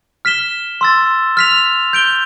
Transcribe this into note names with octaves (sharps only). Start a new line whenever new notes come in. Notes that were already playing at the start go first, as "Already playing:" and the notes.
F6 B6 E7 G7
C6 E6 A6
F6 B6 F7
G6 D7 G7